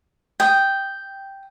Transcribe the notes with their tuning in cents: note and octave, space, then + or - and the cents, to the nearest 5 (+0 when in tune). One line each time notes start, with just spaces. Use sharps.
G5 +0 D#6 +0